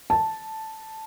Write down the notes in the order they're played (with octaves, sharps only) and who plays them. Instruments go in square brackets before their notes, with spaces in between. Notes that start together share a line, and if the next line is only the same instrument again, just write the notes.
[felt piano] A5